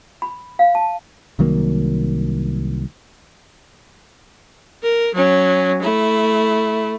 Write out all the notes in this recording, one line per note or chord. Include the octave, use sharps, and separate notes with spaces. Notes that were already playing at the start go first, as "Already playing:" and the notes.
B5
F5
A5
C2 D#3 F#3 A#3
A#4
F#3 C#4
A3 E4